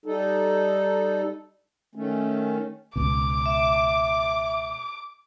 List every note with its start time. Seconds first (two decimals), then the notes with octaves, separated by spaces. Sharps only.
0.06 G3 D#4 A4
1.95 D#3 A3 C#4
2.96 C#2 B2 D6
3.46 E5